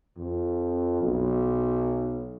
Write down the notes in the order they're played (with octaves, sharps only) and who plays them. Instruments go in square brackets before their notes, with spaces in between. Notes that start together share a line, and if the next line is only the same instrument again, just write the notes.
[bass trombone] F2
B1